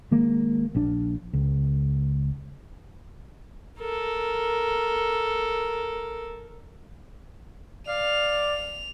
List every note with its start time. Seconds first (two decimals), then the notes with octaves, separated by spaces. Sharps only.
0.11 D#3 G#3 A#3
0.75 A#1 D4
1.33 C#2
3.80 A4 A#4
7.88 D5 F5 F7